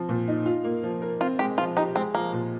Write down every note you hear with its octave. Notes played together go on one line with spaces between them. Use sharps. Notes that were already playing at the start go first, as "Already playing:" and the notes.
Already playing: F3 C4
A#2
D#4
F4
A#3
F3
A#4
C4 F4
G#3 G4
F3 F4
D#4 G4
G#3 C4
F3 A#3
A#2